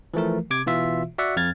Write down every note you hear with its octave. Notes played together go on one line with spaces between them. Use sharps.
E3 F3 A3 A#4
C3 D6 G#6
B2 E3 F4 E5
F#4 D5 E5 F#5
F2 F6 G#6 A6